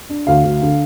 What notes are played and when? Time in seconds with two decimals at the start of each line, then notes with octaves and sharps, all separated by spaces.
0.09 D4
0.27 D2 F5
0.45 D2
0.62 D3